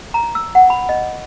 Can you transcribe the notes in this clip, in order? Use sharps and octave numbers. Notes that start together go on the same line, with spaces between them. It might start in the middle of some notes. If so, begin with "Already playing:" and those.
A#5
E6
F#5
B5
D#5